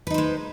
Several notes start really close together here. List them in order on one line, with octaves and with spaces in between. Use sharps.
B4 D#4 C5 G#3